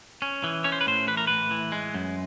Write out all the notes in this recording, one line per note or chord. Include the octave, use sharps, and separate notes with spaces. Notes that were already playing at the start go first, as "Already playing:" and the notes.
C#4
E3
C#4 C#5
C5
B4
A2 C5
E3 B4
A#4
A2 B4
E3
G#3
F#2